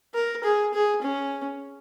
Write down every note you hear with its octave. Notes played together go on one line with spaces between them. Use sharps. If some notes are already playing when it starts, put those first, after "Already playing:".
A#4
G#4
G#4
C#4